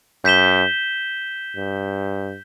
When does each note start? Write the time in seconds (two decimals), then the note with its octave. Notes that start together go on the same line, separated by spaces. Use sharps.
0.24 F#2 G6 B6 E7 G7
1.57 G2